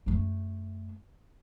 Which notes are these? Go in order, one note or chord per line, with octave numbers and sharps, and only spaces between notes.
F#2 A3